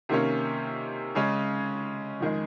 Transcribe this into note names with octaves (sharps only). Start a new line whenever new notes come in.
C3 D#3 A#3 C#4
C#3 G#3 C#4
F2 D#3 G#3